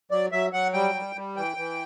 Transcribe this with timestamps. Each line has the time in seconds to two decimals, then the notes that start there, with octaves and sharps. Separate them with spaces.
0.11 F#3 D5
0.32 F#3 E5
0.53 F#3 F#5
0.74 G3 G5
0.95 G3
1.16 G3
1.36 E3 G5
1.57 E3